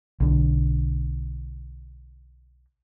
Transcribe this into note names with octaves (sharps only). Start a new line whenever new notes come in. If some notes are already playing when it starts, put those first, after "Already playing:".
B1 D3